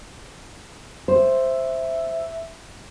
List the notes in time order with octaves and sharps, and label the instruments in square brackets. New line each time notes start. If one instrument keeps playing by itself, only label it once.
[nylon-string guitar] C5 [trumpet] E5